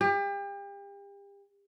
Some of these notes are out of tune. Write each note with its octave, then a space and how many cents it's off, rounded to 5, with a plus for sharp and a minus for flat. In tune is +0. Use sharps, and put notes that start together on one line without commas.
G4 +35